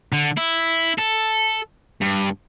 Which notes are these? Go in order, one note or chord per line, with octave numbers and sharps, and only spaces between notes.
D3
E4
A4
G2